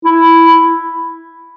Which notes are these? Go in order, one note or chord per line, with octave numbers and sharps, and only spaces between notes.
E4